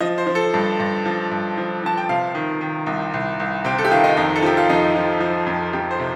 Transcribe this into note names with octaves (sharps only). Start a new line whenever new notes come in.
F3 D#5
C5
F3
A4
G2
G2
F3
G2
F3
F3 A5
G5
C3 F5
D#3
D#3
C2
C2
C2
C3 G5
A4
G4
D#3 F4
D#4
F2 D#4
A4
F3 G4
F4
F2 D#4
F3
F3
F2
F2 G4
C5
C3